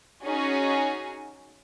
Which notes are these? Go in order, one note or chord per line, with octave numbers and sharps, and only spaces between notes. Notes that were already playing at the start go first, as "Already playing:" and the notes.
C#4 D#4 F#4 G#4 C#5 G#5